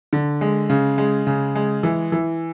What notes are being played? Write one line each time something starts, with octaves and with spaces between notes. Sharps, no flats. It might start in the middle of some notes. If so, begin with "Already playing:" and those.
D3
G#3
C#3
G#3
C#3
G#3
E3
E3